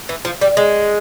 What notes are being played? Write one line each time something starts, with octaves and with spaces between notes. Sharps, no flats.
E3
F3
G3
G#3